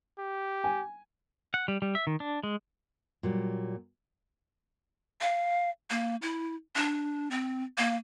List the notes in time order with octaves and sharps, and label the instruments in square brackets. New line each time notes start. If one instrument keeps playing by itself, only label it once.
[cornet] G4
[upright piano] G#5
[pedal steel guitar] F#5
G3
G3
E5
D#3
D4
G#3
[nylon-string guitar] A#2 F#3 G3
[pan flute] F5
A#3
E4
D4
C4
A#3